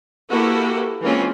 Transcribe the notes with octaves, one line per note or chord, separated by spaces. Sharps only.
A#3 E4 F#4 G4 A4 B4
E3 G#3 A#3 C4 C#4 F4